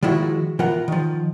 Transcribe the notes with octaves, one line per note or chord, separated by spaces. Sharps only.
D#3 F3 G#3 E4 F#4
E3 F4 A#4 F#5
D#3 F3